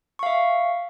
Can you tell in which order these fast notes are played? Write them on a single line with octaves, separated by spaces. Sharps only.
C#6 F5 E5